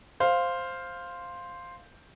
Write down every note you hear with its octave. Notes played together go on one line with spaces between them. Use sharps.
C5 F5